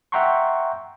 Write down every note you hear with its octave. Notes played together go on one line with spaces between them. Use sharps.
E5 F#5 G5 A#5 C6 C#6